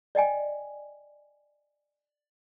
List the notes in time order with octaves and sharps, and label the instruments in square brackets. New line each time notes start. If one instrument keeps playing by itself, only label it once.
[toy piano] D5 D#5 G5 G#5